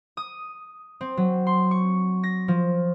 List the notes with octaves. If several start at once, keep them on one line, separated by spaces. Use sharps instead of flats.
D#6
C4
F#3
C6
C#6
A#6
F3